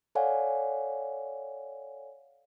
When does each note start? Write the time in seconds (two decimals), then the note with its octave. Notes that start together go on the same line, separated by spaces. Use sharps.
0.15 A4 C#5 D5 F5 F#5 G#5